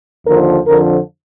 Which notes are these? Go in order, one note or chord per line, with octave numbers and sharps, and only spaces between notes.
D#2 D3 F3 A#4
F2 D3 F3 A#4